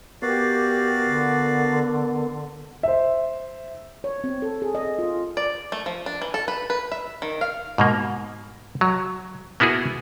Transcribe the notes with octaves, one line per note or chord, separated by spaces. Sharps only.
B3 F#4 G4 A#4 D5 F5
D3
C5 E5
C#5
C4
A4
G#4
D#5
F4
D5
A3
F3
D4
E3
A4
B4
B4
E5
D#3
F5
G#2 B2 A#3
F#3
A#3 B3 E4 F#4 G#4